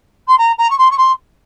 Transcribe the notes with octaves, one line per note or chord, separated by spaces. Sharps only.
C6
A#5
A#5
C#6
C6
C#6
C6